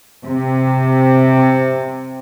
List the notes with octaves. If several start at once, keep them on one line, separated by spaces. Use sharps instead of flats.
C3